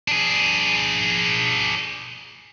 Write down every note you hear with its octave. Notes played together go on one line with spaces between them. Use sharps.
D4 G#4